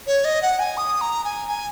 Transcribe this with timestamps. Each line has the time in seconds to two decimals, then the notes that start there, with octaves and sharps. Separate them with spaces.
0.07 C#5
0.25 D#5
0.42 F#5
0.59 G#5
0.77 D#6
1.01 A#5
1.24 G#5
1.48 G#5